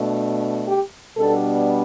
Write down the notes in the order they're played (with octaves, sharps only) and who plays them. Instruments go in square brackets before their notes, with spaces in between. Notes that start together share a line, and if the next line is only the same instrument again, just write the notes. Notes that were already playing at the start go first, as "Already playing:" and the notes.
Already playing: [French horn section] B2 A3 D4
G4
B2 G3 B3 D4 A4